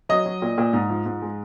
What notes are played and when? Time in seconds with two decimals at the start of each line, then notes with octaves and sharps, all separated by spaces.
0.09 F#3 D#5
0.26 F#3
0.42 A#2
0.58 A#2
0.73 G#2
0.90 F3
1.06 G#2
1.22 G#3